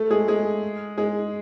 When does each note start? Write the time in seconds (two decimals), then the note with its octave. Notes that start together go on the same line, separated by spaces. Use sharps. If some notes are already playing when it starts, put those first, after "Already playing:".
Already playing: A3 A4
0.10 G#3 G#4
0.28 G#3 G#4
0.98 G#3 G#4